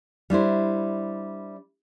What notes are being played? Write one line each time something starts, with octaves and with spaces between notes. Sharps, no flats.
G3 D4 E4 C5